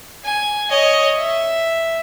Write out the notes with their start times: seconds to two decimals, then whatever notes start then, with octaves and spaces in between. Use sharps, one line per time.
0.25 G#5
0.70 C#5 D#5
1.18 E5